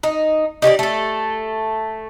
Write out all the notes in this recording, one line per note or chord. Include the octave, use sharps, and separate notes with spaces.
D#4
D#4 G4 C5 D5
A3 A4